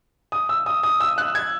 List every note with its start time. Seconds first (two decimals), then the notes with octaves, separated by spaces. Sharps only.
0.32 D#6
0.49 E6
0.66 D#6
0.83 D#6
1.00 E6
1.18 F#6
1.35 G#6